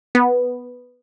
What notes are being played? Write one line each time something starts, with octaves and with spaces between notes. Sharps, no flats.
B3